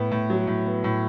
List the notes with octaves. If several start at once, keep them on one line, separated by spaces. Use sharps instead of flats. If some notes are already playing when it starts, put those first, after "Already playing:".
Already playing: A2 B3
A2
F#3
A2
B3
A2